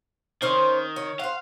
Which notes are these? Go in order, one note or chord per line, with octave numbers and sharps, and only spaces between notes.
D#3 C#4 C5
C#5
C5 F5 F#5